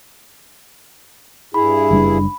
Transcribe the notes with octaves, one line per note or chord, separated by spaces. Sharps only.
G2 E4 G#4 B5
F#1 G3 D4